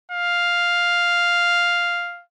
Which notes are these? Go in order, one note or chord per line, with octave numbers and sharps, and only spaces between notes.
F5